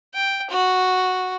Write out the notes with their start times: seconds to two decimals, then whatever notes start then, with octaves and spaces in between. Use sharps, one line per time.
0.14 G5
0.50 F#4